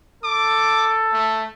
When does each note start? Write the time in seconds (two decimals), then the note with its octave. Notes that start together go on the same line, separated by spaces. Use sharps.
0.24 A4 D6
1.12 A3